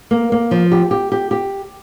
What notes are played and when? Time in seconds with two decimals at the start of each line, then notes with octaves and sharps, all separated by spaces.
0.11 A#3
0.32 A#3
0.51 F3
0.72 G4
0.91 G4
1.12 G4
1.31 G4